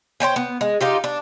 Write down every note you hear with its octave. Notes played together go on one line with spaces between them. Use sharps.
C5 C#5 G5 G#5
B3
G#3
D#4 F4 G4
D4